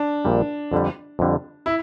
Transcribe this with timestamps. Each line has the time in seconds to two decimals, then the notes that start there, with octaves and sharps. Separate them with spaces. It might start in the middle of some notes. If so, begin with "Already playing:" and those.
Already playing: D4
0.25 A#1 A#2 G3
0.72 F2 D3 G3
1.19 F2 D3 G3
1.66 E4